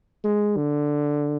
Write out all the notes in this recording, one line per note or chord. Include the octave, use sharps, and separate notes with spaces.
G#3
D3